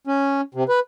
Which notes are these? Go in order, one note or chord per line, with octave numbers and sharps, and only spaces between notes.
C#4
C3
B4